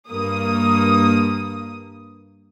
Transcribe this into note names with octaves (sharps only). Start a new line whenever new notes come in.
G2 A#3 D#6